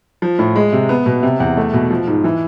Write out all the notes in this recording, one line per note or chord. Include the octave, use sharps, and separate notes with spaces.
F3
A2
G#3
C3
B3
B2
C3
E2
A3
B2
F3
G#2
E3